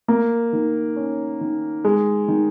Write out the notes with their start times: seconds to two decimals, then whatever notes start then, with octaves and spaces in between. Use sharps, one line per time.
0.08 A#3
0.53 D#3
0.96 C#4
1.41 D#3
1.85 G#3
2.28 D#3